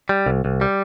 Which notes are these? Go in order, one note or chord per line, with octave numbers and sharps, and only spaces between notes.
G3
C2
C2
G3